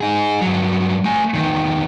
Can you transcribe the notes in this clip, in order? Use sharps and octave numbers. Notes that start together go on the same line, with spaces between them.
D#4 G#4
G2 F#3
A3 G#5
E2 D#3